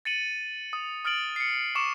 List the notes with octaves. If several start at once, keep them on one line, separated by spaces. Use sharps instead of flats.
A6 C#7 D#7 F#7
D#6
D#6 F6 A6 D7 F#7
C7 C#7
C#6 D6 C#7 E7